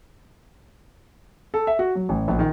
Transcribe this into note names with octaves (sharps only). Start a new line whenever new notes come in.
A4
E5
F#4
F#3
A1
A#1
D#3